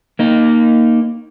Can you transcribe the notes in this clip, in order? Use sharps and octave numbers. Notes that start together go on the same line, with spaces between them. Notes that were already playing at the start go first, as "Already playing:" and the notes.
A#3 D#4